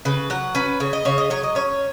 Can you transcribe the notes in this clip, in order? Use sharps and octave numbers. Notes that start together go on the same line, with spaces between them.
C#3 B4
F#3 F#5
C#4 B4
C#3 C#5
D#5
C#3 C#5
D#5
F#3 C#5
D#5
C#4 C#5